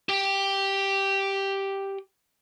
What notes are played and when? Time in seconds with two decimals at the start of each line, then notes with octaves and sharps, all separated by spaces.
0.09 G4 G5